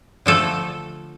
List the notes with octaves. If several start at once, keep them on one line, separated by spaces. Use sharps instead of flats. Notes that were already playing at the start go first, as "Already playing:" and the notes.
D3 F3 A3 A4